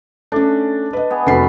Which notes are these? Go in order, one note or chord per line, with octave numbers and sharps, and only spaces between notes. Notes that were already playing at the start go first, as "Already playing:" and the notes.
A3 C#4 D4
B4 D#5
B3 G#4
F1 F#2 B3 F#4 B5 C7